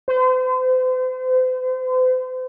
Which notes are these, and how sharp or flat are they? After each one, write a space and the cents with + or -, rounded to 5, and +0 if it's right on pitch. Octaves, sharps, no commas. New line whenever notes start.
C5 -40